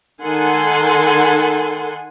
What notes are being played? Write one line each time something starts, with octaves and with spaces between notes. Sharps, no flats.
D#3 A4 F#5 G#5 C6